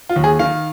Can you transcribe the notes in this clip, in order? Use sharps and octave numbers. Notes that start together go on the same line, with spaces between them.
F4
D#2
G#4
D#3 F5